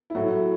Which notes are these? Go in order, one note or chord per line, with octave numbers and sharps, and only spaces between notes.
E4
A2 F#3 A3 F#4